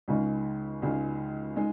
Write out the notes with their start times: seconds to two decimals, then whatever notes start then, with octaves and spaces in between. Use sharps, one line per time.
0.08 C#2 C#3 G#3 D#4
0.82 C#2 C#3 G#3 D#4
1.56 G#3 D#4